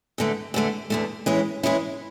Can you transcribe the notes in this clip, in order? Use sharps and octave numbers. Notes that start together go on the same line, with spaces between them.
E2 D3 A3
E2 D3 A3
E2 D3 A3
E3 G#3 C#4 E4
E3 G#3 C#4 E4